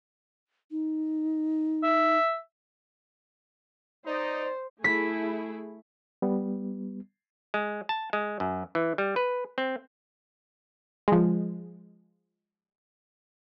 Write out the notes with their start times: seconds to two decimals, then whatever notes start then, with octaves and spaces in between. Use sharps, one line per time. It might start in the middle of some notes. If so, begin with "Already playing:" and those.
0.71 D#4
1.83 E5
4.06 D#4 C5 D5
4.84 A3 E4 G#4 B6
6.22 G3 B3
7.54 G#3
7.89 A5
8.13 G#3
8.40 F#2
8.75 E3
8.98 G3
9.16 B4
9.58 C4
11.08 F3 G#3